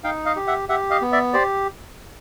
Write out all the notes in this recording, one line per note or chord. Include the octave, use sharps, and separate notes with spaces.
D#4 F5 G5
D#5 F5
G4
E5 F#5
G4 E5 F#5
D#5 F5
B3
D5 E5
G4 C5 D5